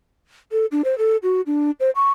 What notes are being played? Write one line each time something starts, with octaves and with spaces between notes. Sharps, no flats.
A4
D4
C5
A4
F#4
D4
C5
C#6